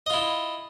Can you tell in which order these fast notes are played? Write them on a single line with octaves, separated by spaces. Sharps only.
D#5 F4 E4